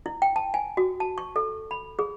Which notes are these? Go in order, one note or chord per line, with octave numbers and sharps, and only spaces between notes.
E4
G5
A5
G#5
F#4
A5
C#6
A4
B5
G#4